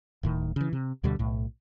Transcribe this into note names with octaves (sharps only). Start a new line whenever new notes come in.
D1 A2 D#3
C#3 E3
C3
D2 B2 D3 G3
B1 A2